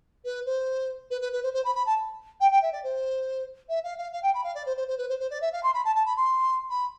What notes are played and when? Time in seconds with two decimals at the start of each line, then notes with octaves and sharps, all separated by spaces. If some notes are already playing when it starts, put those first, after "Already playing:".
0.24 B4
0.45 C5
1.10 B4
1.21 B4
1.32 B4
1.43 C5
1.53 C5
1.64 B5
1.75 B5
1.86 A5
2.40 G5
2.51 G5
2.62 E5
2.72 D5
2.83 C5
3.69 E5
3.84 F5
3.98 F5
4.12 F5
4.22 G5
4.34 B5
4.43 F5
4.54 D5
4.66 C5
4.76 C5
4.87 C5
4.97 B4
5.09 C5
5.19 C5
5.30 D5
5.41 E5
5.52 F5
5.63 C6
5.74 B5
5.84 A5
5.95 A5
6.05 B5
6.16 C6
6.70 B5